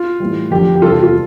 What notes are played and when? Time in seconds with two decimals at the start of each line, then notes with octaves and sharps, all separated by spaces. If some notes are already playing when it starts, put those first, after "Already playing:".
Already playing: F4
0.20 A2 E3 G3
0.51 F2 D3 F3 G4
0.75 G4
0.82 E2 C3 E3 G3 F4 A4
0.92 F4
1.03 F4